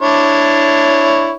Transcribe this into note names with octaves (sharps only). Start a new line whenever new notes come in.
D4 E4 C#5